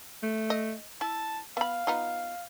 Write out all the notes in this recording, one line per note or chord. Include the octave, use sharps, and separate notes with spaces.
A3
D#5
E4 A5
B3 F5 B5
B3 D#4 F4